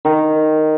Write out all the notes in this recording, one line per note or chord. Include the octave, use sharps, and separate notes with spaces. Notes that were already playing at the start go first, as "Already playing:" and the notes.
D#3